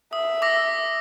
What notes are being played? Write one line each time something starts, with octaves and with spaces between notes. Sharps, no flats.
E5 D#6
D6 E6 A#6